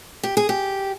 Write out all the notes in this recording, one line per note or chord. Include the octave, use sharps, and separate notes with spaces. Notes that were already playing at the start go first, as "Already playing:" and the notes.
G4
G#4
G4